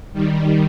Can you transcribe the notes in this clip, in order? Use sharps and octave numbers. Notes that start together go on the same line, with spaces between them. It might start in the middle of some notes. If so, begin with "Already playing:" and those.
D#3 G3